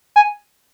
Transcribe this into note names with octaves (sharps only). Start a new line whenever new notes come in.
G#5